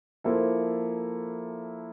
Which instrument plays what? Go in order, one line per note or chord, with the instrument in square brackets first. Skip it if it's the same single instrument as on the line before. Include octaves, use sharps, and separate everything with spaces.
[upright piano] F3 A#3 E4 A4